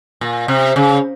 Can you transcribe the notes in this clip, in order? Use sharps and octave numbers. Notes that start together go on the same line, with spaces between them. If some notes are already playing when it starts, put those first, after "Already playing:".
A#2
C3
C#3